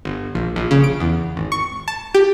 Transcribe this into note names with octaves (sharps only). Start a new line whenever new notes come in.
G1
A#1
A#1
C#3
D7
E2
G#1
C#6
A5
G4